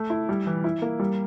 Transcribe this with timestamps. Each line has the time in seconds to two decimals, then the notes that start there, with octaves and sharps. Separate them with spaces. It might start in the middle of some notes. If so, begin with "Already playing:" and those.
Already playing: A3
0.10 E4
0.29 G3
0.47 E3
0.64 E4
0.82 A#3
1.00 G3